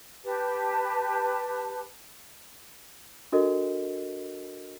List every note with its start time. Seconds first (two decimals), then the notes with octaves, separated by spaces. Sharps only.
0.23 G4 B4 A5
3.32 D4 F#4 A4 A#4 D#5